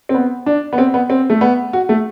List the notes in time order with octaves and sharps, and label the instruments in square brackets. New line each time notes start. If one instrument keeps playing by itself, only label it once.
[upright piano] C4
B3
D4
B3
C4
B3
C4
A3
B3
F#4
A3